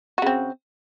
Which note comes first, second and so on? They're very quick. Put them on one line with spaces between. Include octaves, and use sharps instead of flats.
F#4 C#3 C4